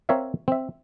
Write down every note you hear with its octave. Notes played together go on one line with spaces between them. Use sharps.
C4 A#4 C#5 E5 F5
C4 E5